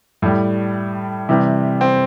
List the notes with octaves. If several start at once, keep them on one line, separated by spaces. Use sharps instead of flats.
A2 G3
C3 E3 G3
C4